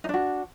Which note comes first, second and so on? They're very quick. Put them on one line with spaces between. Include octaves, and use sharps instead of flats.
D#4 D4 F#4